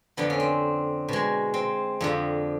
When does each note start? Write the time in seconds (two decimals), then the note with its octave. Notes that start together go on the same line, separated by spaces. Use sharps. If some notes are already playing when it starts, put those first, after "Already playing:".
0.17 F2 D3 F3 B3
0.30 C#4
0.40 C4
1.09 B2 G#3
1.54 C4
2.01 F2 D3 F3